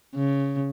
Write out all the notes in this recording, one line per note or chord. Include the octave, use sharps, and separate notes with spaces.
C#3